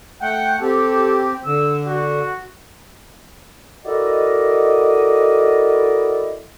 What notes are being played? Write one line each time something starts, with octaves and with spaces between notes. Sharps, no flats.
A3 F#5 G5
C4 G4 A4
D3 E6
F#4
E4 F#4 A4 A#4 D5 D#5